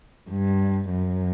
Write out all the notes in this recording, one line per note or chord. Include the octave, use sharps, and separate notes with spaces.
G2
F#2